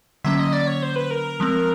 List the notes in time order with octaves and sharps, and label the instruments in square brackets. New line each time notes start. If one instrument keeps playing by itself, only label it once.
[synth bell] D3 F#3 A#3 C#4 [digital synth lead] E5
[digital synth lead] D#5
D5
C#5
C5
B4
A#4
[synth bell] F3 G#3 C4